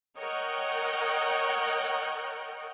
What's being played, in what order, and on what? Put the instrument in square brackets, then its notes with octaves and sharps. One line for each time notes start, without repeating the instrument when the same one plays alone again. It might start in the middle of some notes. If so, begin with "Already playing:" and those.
[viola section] A#4 C#5 D#5 F#5 G5